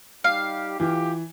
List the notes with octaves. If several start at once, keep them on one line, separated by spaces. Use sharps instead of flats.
G3 D#4 G4 F5
E3 F4 G4